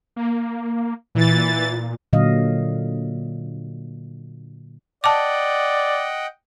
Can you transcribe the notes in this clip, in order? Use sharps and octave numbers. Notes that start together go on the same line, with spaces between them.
A#3
A#2 E3 A6
A#2 D3 F#3 D#5 F5
D5 D#5 F#5 G5 A5 D6